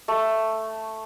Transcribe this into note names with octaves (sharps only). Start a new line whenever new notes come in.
A3